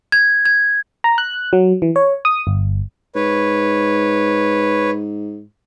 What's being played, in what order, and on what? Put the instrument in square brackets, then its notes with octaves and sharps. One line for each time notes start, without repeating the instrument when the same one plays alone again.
[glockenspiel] G#6
G#6
[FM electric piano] A#5
F#6
F#3
E3
C#5
D#6
G1
[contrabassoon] G#2 [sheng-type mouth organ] B4 C#5